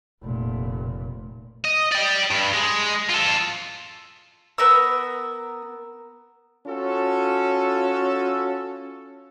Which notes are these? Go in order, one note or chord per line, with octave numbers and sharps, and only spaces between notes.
F1 A#2
D#5
D5 G5
G2
G#3
F4 A4
B3 A#4 E6
C#4 F4 F#4 A4